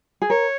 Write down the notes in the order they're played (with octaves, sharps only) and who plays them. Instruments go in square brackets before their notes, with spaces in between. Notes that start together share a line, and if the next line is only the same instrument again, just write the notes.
[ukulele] G#4
[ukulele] A#4 [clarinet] C#5